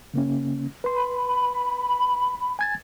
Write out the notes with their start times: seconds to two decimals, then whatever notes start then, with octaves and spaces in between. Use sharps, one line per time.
0.14 C#3 A#3 C#4
0.84 B4 C6
0.96 B5
2.59 G#5 G#6 A6